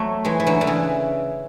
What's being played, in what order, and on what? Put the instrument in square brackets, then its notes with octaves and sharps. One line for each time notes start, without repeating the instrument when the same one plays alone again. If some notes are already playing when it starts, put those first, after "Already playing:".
Already playing: [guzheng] F#3 A3
E3 G#3
E3
D3 F#3
D3
C#3 E3